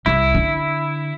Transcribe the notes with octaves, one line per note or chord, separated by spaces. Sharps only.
C2 E4
D3